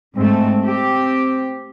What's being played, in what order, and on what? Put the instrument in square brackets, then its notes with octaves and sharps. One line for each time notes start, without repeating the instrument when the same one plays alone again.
[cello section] G#2 A3 [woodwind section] C4
[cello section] G4